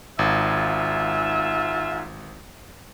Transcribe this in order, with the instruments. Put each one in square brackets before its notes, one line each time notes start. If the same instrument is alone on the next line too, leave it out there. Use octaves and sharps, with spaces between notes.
[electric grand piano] G#1 [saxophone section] G#2 F4 E5